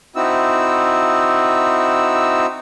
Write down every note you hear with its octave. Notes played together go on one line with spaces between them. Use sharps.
C4 D#4 E4 F#4 E6